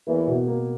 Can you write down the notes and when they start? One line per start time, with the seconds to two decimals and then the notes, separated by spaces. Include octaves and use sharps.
0.07 E2 E3 A#3
0.27 B2
0.47 A#3